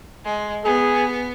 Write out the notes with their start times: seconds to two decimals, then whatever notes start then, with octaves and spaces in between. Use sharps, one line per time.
0.25 G#3
0.65 B3 G#4